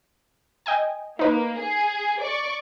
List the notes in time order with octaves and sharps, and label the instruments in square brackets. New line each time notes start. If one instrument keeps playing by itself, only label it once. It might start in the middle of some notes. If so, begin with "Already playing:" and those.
[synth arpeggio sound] D#5 G5 G#5
[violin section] A#3 [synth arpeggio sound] D#4 B4
[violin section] G#4
D5 C#6